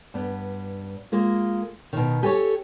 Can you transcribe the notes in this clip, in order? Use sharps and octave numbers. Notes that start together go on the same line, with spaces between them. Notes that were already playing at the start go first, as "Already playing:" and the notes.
G2 B3
G#3 A#3 F4
B2 D#3
G4 A4 C#5 G#5